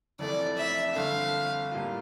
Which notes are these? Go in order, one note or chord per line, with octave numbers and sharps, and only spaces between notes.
F1 F2 E3 A3 D5
E5
G1 F2 D3 F5
A2 G3 A#3 F4